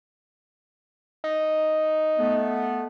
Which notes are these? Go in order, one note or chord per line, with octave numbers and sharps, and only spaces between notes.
D#4
A3 B3